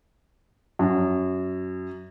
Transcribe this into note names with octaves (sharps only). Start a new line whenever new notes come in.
F#2